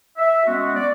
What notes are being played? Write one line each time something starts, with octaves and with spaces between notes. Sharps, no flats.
E5
G#3 B3 C#4 F#4
D5